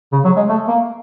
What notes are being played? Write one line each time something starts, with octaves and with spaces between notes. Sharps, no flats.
C#3
F#3
G#3
A3
A#3